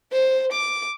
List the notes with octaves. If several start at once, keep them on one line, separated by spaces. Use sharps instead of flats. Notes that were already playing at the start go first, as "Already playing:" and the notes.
C5
D6